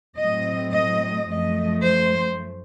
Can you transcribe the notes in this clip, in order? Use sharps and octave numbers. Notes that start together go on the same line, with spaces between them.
A2 F#3 A3 C4 D#5
D#5
F#2 F3 A3 D#5
C5